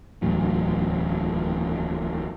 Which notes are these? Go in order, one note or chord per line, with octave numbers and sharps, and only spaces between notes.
D1 E2 A2 F#3